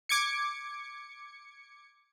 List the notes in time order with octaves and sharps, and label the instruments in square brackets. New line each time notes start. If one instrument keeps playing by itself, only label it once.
[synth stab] D6 G#6 C#7